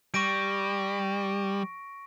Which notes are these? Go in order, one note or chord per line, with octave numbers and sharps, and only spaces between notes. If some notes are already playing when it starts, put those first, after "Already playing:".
G3 C#6 A#6 D7